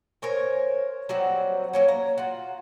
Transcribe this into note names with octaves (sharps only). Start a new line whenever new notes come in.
A#4 C5 C#5 G#5
F#3 G3 C4 F#4
F#3 A#3 C#4
A#5
F4 F#4